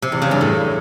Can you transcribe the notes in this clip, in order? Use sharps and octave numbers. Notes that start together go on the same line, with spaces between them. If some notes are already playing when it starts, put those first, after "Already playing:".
C3
E2
C#3
G2
A2